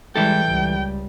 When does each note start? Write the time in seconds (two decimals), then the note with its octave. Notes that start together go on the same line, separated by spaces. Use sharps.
0.16 E3 G3 G#3 E4 A4 G5
0.47 C#2 G3